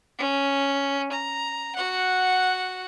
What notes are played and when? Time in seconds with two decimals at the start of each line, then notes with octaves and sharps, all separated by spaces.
0.18 C#4
1.12 A#5
1.76 F#4 F#5